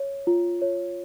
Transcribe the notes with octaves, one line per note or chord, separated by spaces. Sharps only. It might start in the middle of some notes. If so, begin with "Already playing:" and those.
Already playing: C#5
F4
C#5